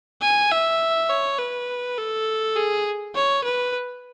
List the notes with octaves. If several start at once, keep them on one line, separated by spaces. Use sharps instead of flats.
G#5
E5
C#5
B4
A4
G#4
C#5
B4